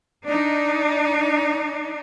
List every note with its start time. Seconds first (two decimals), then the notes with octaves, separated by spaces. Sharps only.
0.25 D4 D#4